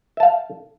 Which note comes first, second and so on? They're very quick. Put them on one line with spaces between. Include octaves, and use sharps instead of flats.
E5 A5 F5